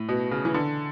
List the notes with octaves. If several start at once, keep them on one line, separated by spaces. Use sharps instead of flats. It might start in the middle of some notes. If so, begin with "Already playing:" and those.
Already playing: A2
B2
C#3
E3
D3